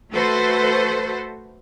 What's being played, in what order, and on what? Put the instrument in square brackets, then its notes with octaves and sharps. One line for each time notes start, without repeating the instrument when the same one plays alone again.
[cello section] A3 F#4 A4 B4 C5